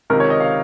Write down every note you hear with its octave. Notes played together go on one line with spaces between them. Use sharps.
C#2 C3 D#3 A#4
C#5
D#5
F5